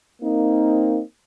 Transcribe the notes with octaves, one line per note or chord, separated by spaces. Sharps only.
A#3 C4 D#4